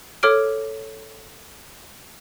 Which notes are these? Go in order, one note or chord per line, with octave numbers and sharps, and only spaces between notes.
A4 C#5 D6 F6 D7